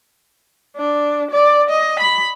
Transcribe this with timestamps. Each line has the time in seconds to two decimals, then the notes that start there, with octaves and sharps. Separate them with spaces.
0.76 D4
1.31 D5
1.69 D#5
1.99 B5